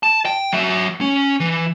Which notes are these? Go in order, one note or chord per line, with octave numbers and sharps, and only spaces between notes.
A5
G5
F#3 E5
C#4
E3